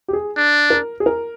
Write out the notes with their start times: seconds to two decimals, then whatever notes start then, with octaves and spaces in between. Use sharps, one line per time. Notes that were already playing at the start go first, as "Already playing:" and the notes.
0.08 G4
0.13 G#4
0.37 D4
0.70 A#4
1.00 G#4
1.06 A#4